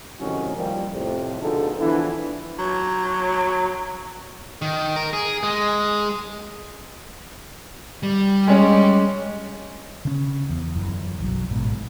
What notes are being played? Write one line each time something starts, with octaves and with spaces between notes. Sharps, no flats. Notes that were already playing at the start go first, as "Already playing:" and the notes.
A2 C3 D#3 F#3 C#4 D#4
F3 G3 A#3
F2 A2 C3
B2 D3 F3 D#4 G#4 A4
D3 E3 F3 B3 D4 E4
F#3
D#3
A#4
G#4
G#3
G3
G#3 C#4
C#3 C#4
E2
G1 F#2 E3
B1 E3 F#3
A1 G#2 B2